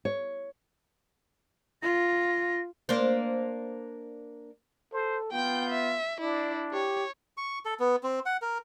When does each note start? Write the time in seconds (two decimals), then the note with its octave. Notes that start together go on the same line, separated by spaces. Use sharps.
0.05 C#5
1.82 F4 A#6
2.89 A#3 D4 C5
4.93 A4 C5
5.32 B3 F4 G5 G6
5.70 E5
6.21 D4 E4 D5
6.73 G4 C#5
7.37 C#6
7.65 A4
7.80 B3
8.03 C4
8.26 F#5
8.42 A#4